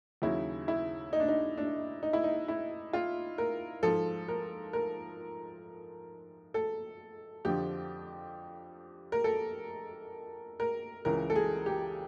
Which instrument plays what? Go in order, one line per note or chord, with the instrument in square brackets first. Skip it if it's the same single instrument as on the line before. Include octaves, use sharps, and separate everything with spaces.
[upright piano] D#2 C#3 F#3 E4
E4
D#4
D4
D#4
D4
D#4
E4
D#4
E4
F4
A#4
G#2 F3 A4
A#4
A#4
A4
F2 D3 F3 G4
A#4
A4
A#4
C#2 C#3 E3 A#4
A4
G#4
G4